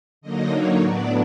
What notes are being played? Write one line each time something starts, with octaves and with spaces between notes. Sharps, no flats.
D3 F#3 A#3 D#4 D#5
C#5
A2 F#3 B3 D4 D5